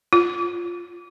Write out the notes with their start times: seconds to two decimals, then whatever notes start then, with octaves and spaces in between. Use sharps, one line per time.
0.13 F4